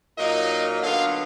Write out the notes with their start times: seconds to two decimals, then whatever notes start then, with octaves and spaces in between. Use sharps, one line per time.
0.18 A#2 F#3 A#3 D#4 D#5
0.82 D3 F#3 B3 F4 F5